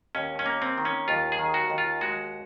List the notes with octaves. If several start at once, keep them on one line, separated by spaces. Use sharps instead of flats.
D#2 C#4
C#4
A#3
C4
D#3
C#4
D#2 F4
G#4
D#3
F#4
D#2
F4
G#3 F#4